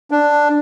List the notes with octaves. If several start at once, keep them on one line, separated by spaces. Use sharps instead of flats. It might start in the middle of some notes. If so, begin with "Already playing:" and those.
D4